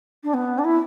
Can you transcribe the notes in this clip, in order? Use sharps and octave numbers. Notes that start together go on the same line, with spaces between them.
D4
B3
D4
E4